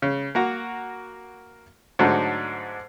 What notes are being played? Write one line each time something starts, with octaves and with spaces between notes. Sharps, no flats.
C#3
A#3 F#4 A#5
G#2 D3 F#3 A3 D4 D#4